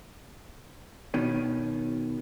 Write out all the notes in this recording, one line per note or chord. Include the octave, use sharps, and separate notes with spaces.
B2 D#3 C#4